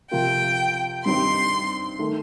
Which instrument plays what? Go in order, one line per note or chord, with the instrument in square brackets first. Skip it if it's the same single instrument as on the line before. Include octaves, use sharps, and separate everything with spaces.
[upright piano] C3 F3 C4 F4 A#4 [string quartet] G5
[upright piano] G2 D#3 G3 C4 D#4 [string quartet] C6
[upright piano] D#3 A3